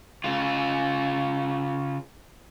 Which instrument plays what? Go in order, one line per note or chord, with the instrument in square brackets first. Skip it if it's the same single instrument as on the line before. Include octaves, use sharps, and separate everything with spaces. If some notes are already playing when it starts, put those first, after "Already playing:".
[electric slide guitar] C#3 F4